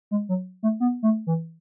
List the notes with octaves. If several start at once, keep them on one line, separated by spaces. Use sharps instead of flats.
G#3
F#3
A3
B3
A3
E3